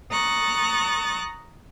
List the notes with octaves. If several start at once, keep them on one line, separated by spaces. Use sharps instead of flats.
A#5 C#6 D#6 F#6 A6